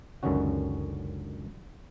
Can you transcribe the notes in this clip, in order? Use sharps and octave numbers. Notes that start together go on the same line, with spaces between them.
C#2 F#2 D3 D#3 C#4 F#4